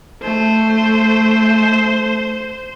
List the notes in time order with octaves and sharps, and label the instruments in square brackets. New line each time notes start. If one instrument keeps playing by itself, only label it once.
[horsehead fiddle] A3 [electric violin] C5